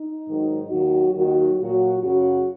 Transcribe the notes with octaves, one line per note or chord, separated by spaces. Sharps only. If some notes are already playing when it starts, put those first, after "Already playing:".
Already playing: D#4
G#2 D#3 F#3
D#2 D#3 F#3 F#4
D#2 D#3 F#3 F#4
A#2 F#3 F#4
F#2 C#3 F#3 F#4